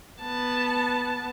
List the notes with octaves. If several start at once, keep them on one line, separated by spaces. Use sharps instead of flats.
B3 A5